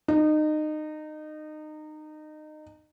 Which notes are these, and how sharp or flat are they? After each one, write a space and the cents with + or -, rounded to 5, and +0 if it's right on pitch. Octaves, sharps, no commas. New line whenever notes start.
D#4 -25